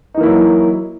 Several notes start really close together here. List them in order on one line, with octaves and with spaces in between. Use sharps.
D#4 E3 A#3 E4 F#3